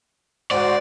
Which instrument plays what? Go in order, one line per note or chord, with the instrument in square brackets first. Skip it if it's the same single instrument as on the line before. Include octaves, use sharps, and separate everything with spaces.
[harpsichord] G#2 [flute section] F#4 C5 G5 [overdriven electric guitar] D5